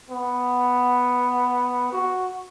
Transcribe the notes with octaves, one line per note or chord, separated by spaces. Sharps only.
B3
F#4